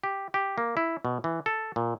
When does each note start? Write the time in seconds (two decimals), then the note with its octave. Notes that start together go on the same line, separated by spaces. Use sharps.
0.04 G4
0.34 G4
0.58 A#3
0.77 E4
1.05 B2
1.24 E3
1.46 A4
1.76 A#2